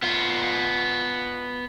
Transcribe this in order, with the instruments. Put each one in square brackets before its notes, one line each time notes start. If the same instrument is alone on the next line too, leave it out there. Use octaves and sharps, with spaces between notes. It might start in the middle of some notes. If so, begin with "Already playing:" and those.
[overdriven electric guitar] B3 F4